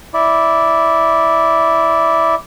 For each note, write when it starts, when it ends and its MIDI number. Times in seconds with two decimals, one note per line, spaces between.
0.14 2.35 64
0.14 2.35 74